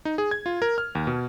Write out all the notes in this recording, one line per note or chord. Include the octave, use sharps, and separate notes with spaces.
D#4
G#4
G#6
F4
A#4
F6
D#2
B2